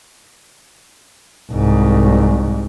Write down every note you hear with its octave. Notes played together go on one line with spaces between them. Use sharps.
C2 G#2